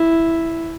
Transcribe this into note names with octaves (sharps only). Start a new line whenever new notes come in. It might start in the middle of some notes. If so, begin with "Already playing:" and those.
Already playing: E4